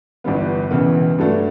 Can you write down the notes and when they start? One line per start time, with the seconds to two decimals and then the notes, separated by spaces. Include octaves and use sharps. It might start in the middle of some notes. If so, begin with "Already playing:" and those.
0.24 G1 G2 E3 G3 B3
0.71 E1 E2 C#3 E3 B3
1.18 G2 F#3 A3 D4